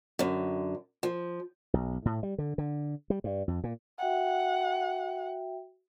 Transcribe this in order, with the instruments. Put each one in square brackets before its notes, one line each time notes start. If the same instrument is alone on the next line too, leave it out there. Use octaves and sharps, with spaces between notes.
[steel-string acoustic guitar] F#2 D3
F3
[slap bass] B1
A2
G3
D3
D3
G3
G2
F2
A#2
[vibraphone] F#4 E5 G5 [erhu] F#5